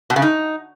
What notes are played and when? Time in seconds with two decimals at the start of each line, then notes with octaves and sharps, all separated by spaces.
0.10 B2
0.16 C#3
0.22 D#4